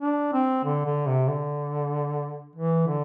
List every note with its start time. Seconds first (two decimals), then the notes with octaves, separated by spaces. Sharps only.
0.01 D4
0.33 C4
0.64 D3
0.86 D3
1.07 C3
1.29 D3
2.56 E3
2.87 D3